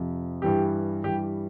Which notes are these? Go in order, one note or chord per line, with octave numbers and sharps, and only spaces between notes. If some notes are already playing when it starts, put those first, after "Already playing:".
Already playing: F2 C3 F3
G2 E3 G3 G4
G2 E3 G3 G4